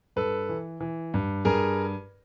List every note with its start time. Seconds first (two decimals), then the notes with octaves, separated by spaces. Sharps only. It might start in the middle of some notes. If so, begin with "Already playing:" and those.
0.16 G2 A4 B4
0.49 E3
0.80 E3
1.14 G2
1.45 G2 G#4 A#4